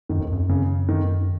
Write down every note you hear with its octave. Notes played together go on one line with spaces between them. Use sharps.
F#2 D#3
F2
F#2
C#3
D#3